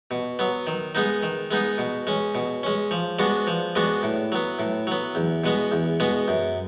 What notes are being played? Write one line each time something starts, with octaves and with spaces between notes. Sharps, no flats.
B2
F#3 B3
D#3
G#3 B3 D#4
D#3
G#3 B3 D#4
B2
G#3 C#4
B2
G#3 C#4
F3
G#3 B3 D4 F#4
F3
G#3 B3 D4 F#4
A2
F#3 B3
A2
F#3 B3
E2
B2 G#3 B3
E2
B2 G#3 B3
F#2